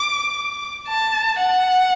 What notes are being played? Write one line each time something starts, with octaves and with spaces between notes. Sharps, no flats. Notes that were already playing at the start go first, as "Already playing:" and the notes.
Already playing: D6
A5
F#5